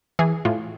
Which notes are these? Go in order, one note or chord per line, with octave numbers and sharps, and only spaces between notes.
E3 G#4
A2 F4